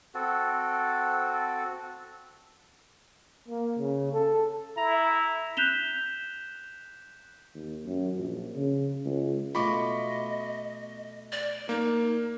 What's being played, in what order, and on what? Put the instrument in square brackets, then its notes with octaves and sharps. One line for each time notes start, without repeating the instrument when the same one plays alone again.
[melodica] C4 F#4 A4
[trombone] A#3
C#3
A4
[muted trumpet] E4 [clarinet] A#5
[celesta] F#6 G6 B6 E7 F7 G7
[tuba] D#2
F#2
A#1
C#3
C#2
[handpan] B2 A3 F4 [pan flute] D#5 [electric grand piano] B5 C#6 D6
[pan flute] D5
[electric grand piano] A#3 [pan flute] D#4